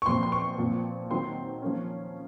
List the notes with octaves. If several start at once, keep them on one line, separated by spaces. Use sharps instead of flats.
C#6
A#2 F3 C4 C6
C6
C#6
A#2 F3 C4
D#3 F#3 C4 C6
F3 A#3 C#4